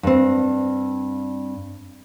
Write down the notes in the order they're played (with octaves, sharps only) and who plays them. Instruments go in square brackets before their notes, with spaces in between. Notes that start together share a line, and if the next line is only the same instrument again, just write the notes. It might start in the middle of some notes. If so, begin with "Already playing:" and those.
[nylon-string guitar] G2 C4